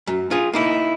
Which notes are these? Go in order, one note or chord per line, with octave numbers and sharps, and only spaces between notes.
F#2
F4 G#4
A#3 D#4 E4